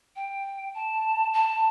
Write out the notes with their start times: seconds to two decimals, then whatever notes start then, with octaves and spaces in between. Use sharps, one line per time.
0.16 G5
0.74 A5
1.33 A5